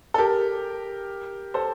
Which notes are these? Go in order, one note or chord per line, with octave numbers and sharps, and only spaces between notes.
A4
G4 A#4
A4 C5